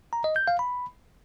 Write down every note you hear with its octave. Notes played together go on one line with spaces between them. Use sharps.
A#5
D#5
G6
F5
B5